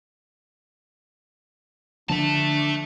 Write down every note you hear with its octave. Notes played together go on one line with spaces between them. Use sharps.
D3 F3 D4 E5 A5